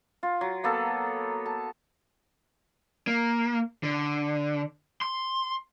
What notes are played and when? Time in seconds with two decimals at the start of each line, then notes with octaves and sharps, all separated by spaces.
0.23 F4
0.41 F#3
0.64 A#3 B3 A4
1.46 A5
3.07 A#3
3.83 D3
5.02 C6